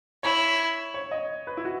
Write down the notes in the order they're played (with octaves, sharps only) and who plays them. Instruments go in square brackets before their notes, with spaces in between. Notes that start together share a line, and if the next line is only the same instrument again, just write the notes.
[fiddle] E4 [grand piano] C#5
[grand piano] C#5
D#5
B4
E4
F#4